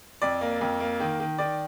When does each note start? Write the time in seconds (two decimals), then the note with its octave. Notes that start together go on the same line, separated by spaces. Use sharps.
0.22 F2 D5
0.41 A#3
0.61 F2
0.80 A#3
1.00 D#3
1.20 D#3
1.38 D#3 D5